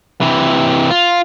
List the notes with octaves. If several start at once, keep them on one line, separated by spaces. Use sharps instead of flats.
C3 E3
F4